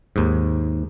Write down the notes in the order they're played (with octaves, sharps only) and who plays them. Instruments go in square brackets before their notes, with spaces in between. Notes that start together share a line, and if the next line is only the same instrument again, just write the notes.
[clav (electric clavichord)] D#2 G#2